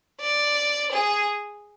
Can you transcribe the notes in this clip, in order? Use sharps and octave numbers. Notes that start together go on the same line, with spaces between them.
D5
G#4